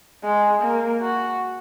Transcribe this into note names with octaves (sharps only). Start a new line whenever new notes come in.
G#3
A#3
F#4